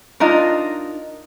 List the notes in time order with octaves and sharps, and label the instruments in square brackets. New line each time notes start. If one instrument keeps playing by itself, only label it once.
[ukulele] D4 D#4 F4 A#4